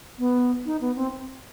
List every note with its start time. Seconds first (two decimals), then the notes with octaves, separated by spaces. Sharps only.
0.19 B3
0.66 D#4
0.81 B3
0.96 C4